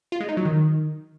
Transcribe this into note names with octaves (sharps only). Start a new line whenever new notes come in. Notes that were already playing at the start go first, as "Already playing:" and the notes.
F4
G#3
D#4
F#3
D#3